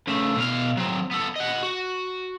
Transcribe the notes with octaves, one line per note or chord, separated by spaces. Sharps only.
C#3 A3
B2 F5
F#3 C4
B3 A4
D#5 F#5
F#4